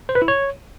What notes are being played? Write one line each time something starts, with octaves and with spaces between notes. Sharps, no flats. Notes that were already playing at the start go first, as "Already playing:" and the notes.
C5
B4
E4
C#5